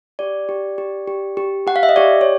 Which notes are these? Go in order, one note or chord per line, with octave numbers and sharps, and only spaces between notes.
G4 D5
G4
G4
G4
G4
G4 F#5
F5
E5
D#5
G4 D5
C#5